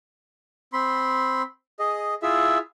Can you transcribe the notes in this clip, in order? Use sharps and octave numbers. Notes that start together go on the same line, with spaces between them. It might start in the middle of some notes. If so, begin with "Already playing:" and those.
C4 B5 C6
G#4 D#5
E4 F4 G#4 E5